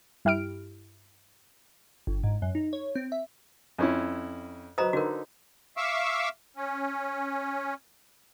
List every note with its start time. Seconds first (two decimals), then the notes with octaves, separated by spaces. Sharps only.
0.25 G2 E4 G4 F6 D7
2.07 G1
2.23 G#2
2.42 F#2
2.55 D#4
2.73 C#5
2.95 C4
3.12 E5
3.78 F2 C#4 E4
4.78 F#3 B4 C5 D#5 A#5 D#6
4.93 D3 D#4 F#4 A#4 B4
5.77 E5 F5 C#6 D6 E6
6.56 C#4